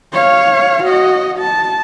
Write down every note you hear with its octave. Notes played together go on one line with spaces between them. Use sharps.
C#5 F5
F#4 D#5
A5